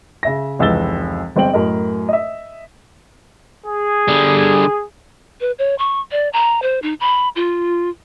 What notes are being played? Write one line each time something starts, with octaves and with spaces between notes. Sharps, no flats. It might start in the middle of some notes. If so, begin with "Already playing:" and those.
C#3 E5 A#6
F1 C#2 E3 E6 A6 G7
G1 G#3 C4 G5 F#7
F#2 A2 A#4 D#5
D#5 E5
G#4
D3 G3
B4
C#5
C#6
D5
A#5
C5
D#4
B5
F4